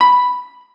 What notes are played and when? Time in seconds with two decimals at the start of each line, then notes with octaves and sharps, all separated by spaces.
0.01 B5